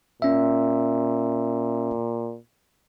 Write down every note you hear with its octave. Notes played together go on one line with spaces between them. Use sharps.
A#2 C#4 E5